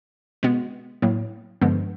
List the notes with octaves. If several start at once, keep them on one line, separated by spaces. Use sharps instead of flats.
B2 G#3 B3
A2 F#3 A#3
G2 D3 F3 G#3 B3